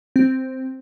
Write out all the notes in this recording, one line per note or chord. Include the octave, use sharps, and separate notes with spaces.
C4